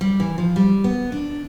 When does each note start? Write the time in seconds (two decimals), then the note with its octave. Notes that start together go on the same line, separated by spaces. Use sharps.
0.01 G3
0.20 E3
0.38 F3
0.56 G3
0.84 B3
1.12 D4